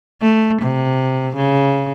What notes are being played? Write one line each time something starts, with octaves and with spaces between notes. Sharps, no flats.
A3
C3
C#3